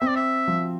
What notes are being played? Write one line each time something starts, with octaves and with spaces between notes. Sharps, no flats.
C4 E5
D5
E5
F3